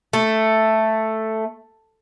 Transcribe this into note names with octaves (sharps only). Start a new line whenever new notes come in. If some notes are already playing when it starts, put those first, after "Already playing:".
A3